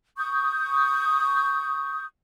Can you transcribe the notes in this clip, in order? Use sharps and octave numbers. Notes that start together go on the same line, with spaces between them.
C#6 D#6 G6